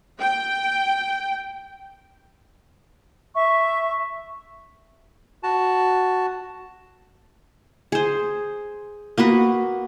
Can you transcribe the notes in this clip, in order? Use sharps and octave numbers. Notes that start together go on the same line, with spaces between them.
G5
E5 C#6
F#4 A5
G#4 C5
A#3 B3 F#4 B4